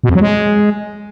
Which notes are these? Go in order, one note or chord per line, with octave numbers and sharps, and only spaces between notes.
B2
F2
F#3
G#3